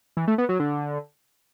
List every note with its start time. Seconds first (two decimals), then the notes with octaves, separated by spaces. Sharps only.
0.17 E3
0.27 A3
0.38 B3
0.49 F#3
0.60 D3